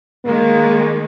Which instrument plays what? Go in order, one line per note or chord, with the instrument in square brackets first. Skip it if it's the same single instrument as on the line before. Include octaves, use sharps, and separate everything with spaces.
[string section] D#3 G#3 [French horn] A#3